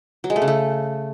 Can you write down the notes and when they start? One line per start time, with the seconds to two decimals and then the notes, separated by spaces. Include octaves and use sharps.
0.24 F#3
0.30 G#3
0.36 A3
0.42 C#3
0.48 A3